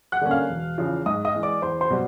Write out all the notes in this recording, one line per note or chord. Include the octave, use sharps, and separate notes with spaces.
F#5 F#6
D3 G3 A#3 C#4
F5 F6
E1
E2 C#3 F3
G#2 D#5 D#6
D#5 D#6
E3 G#3
D5 D6
E2 C5 C6
C5 C6
B2 G3